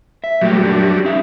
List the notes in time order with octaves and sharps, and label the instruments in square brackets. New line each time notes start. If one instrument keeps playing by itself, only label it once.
[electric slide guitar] E5
[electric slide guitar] A#2 A3 G4 [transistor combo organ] F#3 G3
[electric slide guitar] F#2 D4
C#4 D#4 E5